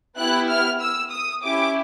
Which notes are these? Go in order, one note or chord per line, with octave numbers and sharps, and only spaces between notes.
B3 E4 G4 F#6
F6
E6
D#6
C#4 E4 G4 D6